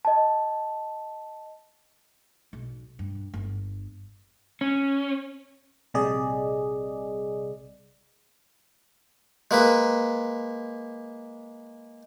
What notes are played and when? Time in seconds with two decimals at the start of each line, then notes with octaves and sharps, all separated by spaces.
0.05 D#5 A5
2.53 B1
2.99 G2
3.34 G1
4.61 C#4
5.94 A#1 C3 G3 G#4 D5 D#5
9.51 G#3 A#3 B4